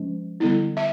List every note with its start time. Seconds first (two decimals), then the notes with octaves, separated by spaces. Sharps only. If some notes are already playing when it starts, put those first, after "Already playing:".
Already playing: F3 G#3 C#4
0.40 D3 G3 B3 E4
0.77 E5